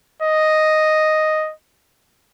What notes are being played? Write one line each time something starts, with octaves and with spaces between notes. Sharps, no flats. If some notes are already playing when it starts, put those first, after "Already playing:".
D#5